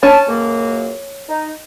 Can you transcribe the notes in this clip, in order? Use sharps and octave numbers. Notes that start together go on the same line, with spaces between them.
C#4 A5
C#2 F#2 A#3
D#4